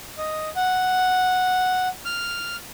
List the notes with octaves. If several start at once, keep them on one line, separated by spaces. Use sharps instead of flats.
D#5
F#5
F6